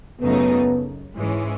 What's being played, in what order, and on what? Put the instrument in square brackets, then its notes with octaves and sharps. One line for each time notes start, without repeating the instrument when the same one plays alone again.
[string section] F#2 C#3 F#3 A3 D#4 [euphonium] B3
[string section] G#2 E3 G#3 C#4